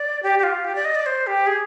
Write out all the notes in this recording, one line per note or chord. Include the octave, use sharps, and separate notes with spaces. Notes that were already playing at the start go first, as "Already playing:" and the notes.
Already playing: D5
G4
G4
F4
G4
D5
D#5
D5
C5
G4
G#4